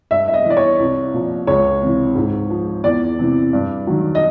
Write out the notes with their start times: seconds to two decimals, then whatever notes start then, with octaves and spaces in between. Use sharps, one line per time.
0.11 G2 E5
0.28 E5
0.34 D#5
0.45 E3 D5
0.57 C#5
0.80 C2
1.13 A#2 F3
1.47 C#2 C#5
1.82 C3 E3
2.16 G#2
2.50 F3
2.84 E2 D5
3.19 C3 E3
3.53 G2
3.87 D#3 F#3
4.15 D#5